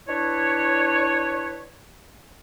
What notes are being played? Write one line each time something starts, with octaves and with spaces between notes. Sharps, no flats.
D4 E4 B4 C#5